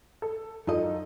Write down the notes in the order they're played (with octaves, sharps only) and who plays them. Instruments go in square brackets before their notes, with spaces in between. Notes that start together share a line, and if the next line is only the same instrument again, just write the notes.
[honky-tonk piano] A4
[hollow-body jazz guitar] F#2 D#5 [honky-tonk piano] D#4 F4 A4